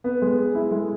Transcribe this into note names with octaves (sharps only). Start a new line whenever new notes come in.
B3
G#3
G#4
E4
G#3